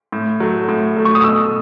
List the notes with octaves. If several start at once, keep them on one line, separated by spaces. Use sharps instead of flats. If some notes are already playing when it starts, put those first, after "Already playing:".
A2
F#3 A3
A2
F#3 A3
C#6
D#6
B2 E6